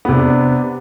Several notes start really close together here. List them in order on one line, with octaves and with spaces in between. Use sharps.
B3 C3 D4